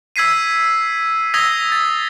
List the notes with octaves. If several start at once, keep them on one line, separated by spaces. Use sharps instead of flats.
E6 G#6 B6 C7 D#7
D#6 E6 G#6 A#6 B6 G7
A6